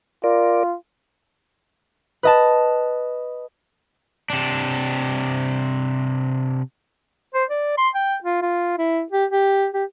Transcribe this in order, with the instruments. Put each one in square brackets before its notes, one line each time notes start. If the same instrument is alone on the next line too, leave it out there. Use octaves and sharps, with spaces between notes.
[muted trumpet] F4 [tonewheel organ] A#4 D5
[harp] B4 D#5 A5
[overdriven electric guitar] C3 D4
[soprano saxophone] C5
D5
C6
G5
F4
F4
E4
G4
G4
G4